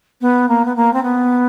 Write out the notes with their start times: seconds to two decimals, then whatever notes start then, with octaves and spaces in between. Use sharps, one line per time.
0.21 B3
0.48 A#3
0.65 B3
0.76 A#3
0.93 C4
1.03 B3